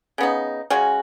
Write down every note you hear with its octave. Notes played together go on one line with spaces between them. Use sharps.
C#3 B3 D#4
C#3 G#3 C#4 F#4